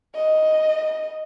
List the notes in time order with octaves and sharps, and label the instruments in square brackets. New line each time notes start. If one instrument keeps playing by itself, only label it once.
[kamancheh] D#5